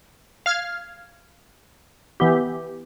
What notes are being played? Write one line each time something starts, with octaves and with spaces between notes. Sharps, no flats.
F5 F6 G#6
E3 B3 G4